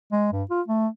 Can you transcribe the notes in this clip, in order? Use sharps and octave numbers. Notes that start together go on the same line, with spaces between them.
G#3
G2
F4
A3